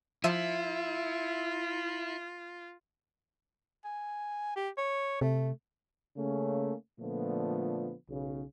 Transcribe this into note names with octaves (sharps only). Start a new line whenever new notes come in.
F3 E4 F4 E5 D#7
G#5
G4
C#5
C3 A3
C#3 A3 A#3 C#4
A#2 D3 F3 A3 B3
B1 C#3